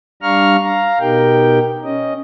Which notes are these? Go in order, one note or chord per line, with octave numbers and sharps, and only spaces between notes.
G3 D4 F5 A#5 C#6 F6
F5 A#5
B2 D#4 G4 A#4 G5
C#4 D#5